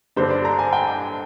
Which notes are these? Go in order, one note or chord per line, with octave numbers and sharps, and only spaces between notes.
G2 D3 G3 D4 C5
D5
A#5
G#5
G5